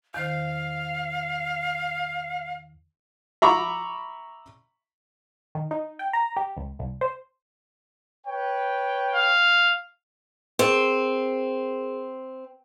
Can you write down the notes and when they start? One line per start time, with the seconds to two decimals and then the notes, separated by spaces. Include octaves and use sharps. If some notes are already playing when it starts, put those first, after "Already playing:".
0.14 E2 D#3 C5 F5
3.42 E5 A#5 B5 C#6 D6
5.55 D#3
5.71 D#4
5.99 G5
6.13 A#5
6.36 G4
6.57 C#2
6.79 C2
7.01 C5
8.27 B4 C#5 G5
9.15 F5
10.59 C4 G#4 A#4